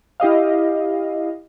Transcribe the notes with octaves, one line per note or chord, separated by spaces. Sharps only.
E4 G4 D#5 F5